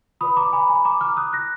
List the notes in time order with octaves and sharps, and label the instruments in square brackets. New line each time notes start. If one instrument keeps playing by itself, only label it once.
[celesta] F4 B4 D5 B5 D#6
A#5 D6
G#5 B5
G#5 B5
A#5 D6
D6 F6
D#6 F#6
F#6 A#6